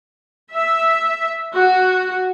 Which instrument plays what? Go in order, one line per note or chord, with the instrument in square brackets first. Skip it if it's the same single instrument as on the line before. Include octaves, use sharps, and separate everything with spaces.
[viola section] E5
F#4